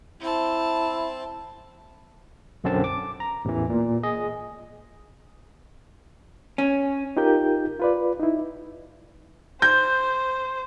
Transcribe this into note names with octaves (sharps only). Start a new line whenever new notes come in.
C4 E4 A5
B1 F#2 D3 C4 C#4 A5
D6
A#5
A1 E2 E3
A#2
G#4 D#5
C#4
D#4 F4 G4 A#4 G6
F4 B4 D5
D#4 E4
C5 G6